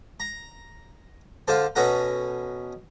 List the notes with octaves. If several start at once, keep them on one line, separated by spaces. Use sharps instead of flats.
A#5
D3 F4 A4 C5 A5
B2 C#4 A4 F#5 A#5